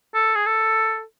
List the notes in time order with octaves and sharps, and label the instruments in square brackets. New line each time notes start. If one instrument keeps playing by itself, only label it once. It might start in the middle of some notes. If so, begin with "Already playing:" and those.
[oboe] A4
G#4
A4